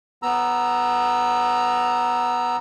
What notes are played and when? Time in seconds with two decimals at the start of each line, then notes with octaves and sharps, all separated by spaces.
0.23 B3 A#5 E6